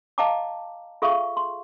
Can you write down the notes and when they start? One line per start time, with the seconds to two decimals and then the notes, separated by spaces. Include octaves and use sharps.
0.18 D#5 F5 G5 A5 A#5 D6
1.02 F4 G#4 A4 E5 F5 C#6
1.37 C6